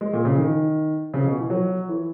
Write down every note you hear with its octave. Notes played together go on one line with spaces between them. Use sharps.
G#3
A#2
C#3
D#3
C#3
B2
E3
F#3
E3